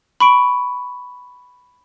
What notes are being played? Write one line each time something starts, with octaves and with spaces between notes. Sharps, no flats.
B5 C#6 D7